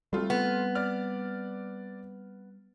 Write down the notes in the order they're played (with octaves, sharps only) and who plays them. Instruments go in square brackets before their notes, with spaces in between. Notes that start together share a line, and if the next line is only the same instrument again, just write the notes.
[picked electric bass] G3 C4 [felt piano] A3 F4 A4
[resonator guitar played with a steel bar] B3
[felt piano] D5 F6